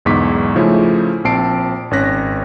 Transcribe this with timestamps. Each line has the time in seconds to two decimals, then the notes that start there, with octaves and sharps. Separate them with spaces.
0.05 B1 E2 G#2 C#6 D6 B6
0.56 C#3 F3 A3 C#4 D#4 E4
1.25 A#1 C4 A5 C7 D7
1.91 G#1 C#4 C#5 F#6 A#6 B6